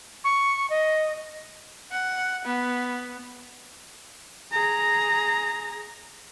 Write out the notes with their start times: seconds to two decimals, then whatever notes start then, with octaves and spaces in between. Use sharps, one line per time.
0.24 C#6
0.70 D#5
1.91 F#5
2.45 B3
4.52 G#4 A#5